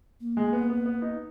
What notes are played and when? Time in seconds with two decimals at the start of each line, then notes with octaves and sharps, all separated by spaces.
0.20 A#3
0.37 G#3
0.53 B3
0.70 B3
0.86 B3
1.02 D#4